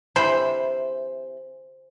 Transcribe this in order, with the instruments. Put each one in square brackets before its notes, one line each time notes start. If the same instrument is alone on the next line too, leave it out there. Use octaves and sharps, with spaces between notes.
[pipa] C3 E3 B5 [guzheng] C5